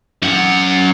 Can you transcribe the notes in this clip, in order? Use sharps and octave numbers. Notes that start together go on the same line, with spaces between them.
F#2 F#5